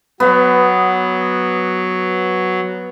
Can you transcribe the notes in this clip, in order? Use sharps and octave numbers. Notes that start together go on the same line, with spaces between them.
F#3 B3